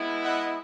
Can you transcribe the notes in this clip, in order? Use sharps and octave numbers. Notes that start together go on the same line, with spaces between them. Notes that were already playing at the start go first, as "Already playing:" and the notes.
Already playing: G#3 B3 E4
D#5 F#5